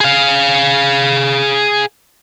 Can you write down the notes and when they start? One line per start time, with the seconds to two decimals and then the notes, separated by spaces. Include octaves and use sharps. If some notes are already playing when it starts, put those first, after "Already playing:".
0.01 G#4 F5